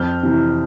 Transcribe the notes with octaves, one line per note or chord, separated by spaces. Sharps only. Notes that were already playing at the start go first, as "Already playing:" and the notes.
Already playing: F2 F6 G6
C3 E3